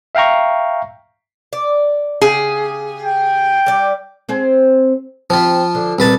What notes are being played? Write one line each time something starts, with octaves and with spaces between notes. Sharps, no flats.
E5 F5 G5 A#5 C#6
D5
C#3 G4 G#4
G5
G3 D5
C4 G#4 C5
F3 C4 F4 G4
D3
C2 A#2 B4 A5